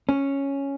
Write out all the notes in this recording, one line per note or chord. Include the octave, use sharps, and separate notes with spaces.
C#4